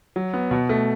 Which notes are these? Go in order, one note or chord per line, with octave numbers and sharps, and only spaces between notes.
F#3
B3
B2
A3